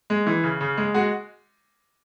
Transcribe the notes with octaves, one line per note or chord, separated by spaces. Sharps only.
G#3
E3
C#3
C#3
G#3
G#3 F#4